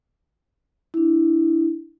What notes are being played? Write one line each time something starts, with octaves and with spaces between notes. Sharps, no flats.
D4 E4